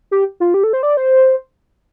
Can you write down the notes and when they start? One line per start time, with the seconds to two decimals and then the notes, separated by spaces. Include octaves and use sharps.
0.11 G4
0.40 F4
0.54 G4
0.64 A4
0.73 C5
0.83 D5
0.97 C5